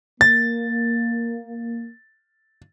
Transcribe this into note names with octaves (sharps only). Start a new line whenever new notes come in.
A#3 A6